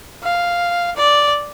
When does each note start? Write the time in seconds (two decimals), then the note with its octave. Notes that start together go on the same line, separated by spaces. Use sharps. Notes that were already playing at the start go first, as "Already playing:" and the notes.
0.23 F5
0.96 D5